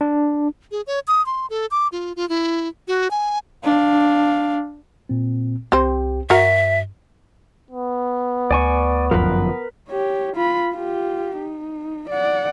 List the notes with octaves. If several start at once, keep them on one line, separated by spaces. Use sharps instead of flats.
D4
G#4
C#5
D#6
C6
A4
D6
F4
F4
E4
F#4
G#5
D4 F5
A#2 C4
C2 C4 G4 C5 G5
G2 F#4 A#4 E5
B3
D2 D5 G#5 C#6
G1 F#2 F3 A#4 B4
G4 C#5
F4 B5
F4 G4
D#4
D5 F#5